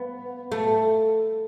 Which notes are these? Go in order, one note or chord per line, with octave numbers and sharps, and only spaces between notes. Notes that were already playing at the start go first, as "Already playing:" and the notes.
Already playing: B3
A3